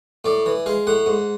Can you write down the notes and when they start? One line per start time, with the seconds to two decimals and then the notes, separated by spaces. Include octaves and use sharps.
0.25 A2 D5
0.46 E3
0.66 G#3 F5
0.87 A2 F#5
1.06 G#2